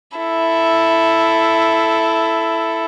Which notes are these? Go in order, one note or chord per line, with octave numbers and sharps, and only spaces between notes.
E4 A4